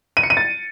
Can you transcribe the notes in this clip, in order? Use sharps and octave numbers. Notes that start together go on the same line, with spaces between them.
D#7
C#7
D#7
A6